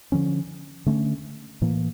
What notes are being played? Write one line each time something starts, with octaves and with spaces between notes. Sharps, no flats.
D3 F3 C#4
D3 A3 C#4
A2 E3 A#3